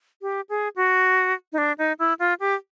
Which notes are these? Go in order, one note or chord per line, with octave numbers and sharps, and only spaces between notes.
G4
G#4
F#4
D#4
D4
D#4
E4
F4
G4